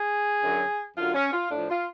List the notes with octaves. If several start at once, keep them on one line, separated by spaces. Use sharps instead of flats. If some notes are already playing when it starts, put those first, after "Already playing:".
Already playing: G#4
F#2 D3 F#3
F#2 D3 F#3 F4
C#4
F4
A2 F3 D4
F4